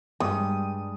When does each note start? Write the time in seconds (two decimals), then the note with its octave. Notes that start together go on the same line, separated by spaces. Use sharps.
0.20 G2 G3 G#3 G5 D#6